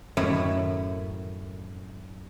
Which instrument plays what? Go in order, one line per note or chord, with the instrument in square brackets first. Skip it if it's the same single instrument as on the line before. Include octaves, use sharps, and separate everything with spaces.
[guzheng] F#2 A2 D#3 E4 C#5 E5